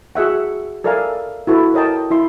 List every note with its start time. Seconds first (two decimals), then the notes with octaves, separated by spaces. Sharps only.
0.15 F#4 G#4 E5 F#5
0.84 A4 A#4 D5 E5 F5 G#5
1.47 E4 F#4 A4 B4
1.74 A#4 C#5 D#5 G5 A5
2.11 E4 E5 C6